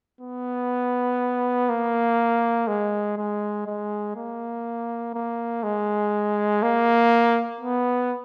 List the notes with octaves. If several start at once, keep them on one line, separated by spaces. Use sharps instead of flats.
B3
A#3
G#3
G#3
G#3
A#3
A#3
G#3
A#3
B3